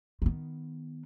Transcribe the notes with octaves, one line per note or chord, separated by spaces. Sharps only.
D#3 B3